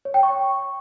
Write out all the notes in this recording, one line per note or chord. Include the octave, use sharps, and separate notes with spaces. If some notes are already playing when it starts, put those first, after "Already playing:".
C#5
G5
C#6